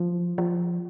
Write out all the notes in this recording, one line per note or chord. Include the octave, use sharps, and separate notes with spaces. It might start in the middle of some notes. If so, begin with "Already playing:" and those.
Already playing: F3
F3